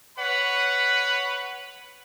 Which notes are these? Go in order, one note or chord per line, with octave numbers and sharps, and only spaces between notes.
B4 C#5 F#5 B5